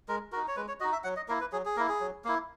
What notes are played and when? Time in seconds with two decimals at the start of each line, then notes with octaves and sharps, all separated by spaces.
0.08 G#3 A#4
0.32 D#4 F#4 A#4
0.48 C#5
0.56 G#3 B4
0.68 C#5
0.80 D#4 F#4 D#5
0.92 E5
1.04 F#3 F#5
1.16 D#5
1.28 A#3 E4 A#4
1.41 B4
1.52 F#3 G#4
1.65 G#4
1.77 A#3 A#4
1.79 E4
1.89 G#4
2.00 F#3
2.25 A#3 E4